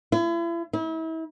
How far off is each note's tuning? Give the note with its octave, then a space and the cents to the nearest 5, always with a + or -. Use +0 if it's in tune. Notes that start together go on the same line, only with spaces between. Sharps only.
E4 +40
E4 -35